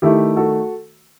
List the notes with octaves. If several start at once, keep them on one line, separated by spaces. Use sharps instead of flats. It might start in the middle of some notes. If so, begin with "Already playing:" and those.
D#3 A3 E4 G4
F#4 A4